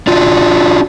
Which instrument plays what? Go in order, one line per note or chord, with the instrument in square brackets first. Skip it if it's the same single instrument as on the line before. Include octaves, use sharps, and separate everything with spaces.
[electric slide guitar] D4 F4 F#4